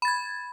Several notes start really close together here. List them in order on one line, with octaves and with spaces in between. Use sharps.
B5 A6 G#6